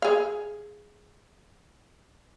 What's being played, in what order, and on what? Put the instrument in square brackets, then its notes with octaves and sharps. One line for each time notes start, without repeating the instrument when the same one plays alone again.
[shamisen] G#4 F5